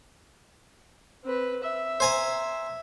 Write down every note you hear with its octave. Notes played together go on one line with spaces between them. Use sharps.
C4 B4
E5
C5 G#5 A#5